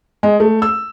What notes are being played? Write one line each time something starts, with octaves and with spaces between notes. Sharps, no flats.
G#3
A3
E6